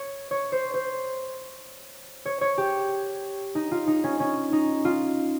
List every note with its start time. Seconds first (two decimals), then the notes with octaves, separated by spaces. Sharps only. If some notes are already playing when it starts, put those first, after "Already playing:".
Already playing: C#5
0.31 C#5
0.52 C5
0.74 C5
2.25 C#5
2.41 C#5
2.58 G4
3.55 D#4
3.71 F4
3.87 D#4
4.04 C#4
4.20 C#4
4.53 D#4
4.85 F4